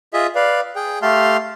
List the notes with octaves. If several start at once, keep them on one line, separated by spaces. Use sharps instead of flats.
F4 G#4 D#5 E5
B4 D5 F5
G#4 G5
A3 G4 F5 A5 C6 F6